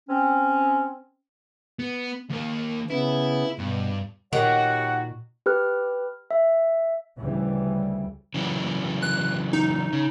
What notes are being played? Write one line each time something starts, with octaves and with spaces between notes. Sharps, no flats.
C4 C#4
B3
D#2 A#3
C#3 B3 E4
G2 B2
A#2 D#3 F#4 G4 C#5 F#5
G4 B4 F6 F#6
E5
D2 C#3 E3 G3
C#3 E3 F#3
F#6
D#4
C#3